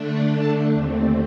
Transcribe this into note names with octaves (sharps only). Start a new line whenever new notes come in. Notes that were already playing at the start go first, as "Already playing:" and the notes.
Already playing: D3 A3 D4
A5
D#2 D3 A3 C4